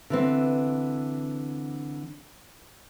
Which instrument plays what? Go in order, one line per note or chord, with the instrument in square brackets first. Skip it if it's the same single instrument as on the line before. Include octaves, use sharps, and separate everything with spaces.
[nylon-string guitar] D3 E3 C4